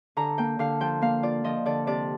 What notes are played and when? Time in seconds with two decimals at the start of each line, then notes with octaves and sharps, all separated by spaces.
0.17 D3 A#5
0.38 A#3 G5
0.59 D3 F5
0.80 F3 G5
1.01 A#3 F5
1.23 F4 D5
1.44 F3 D#5
1.66 D3 D5
1.87 C3 D5